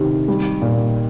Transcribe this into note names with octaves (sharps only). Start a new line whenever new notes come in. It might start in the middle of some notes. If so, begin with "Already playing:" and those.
Already playing: C3 D#3
G3
A#2